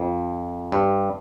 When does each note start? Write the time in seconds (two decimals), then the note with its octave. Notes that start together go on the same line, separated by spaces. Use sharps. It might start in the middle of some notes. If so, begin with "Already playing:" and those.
Already playing: F2
0.72 G2